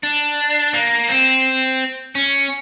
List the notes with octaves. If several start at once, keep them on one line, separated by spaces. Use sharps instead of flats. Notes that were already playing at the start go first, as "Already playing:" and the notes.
D4
A#3
C4
C#4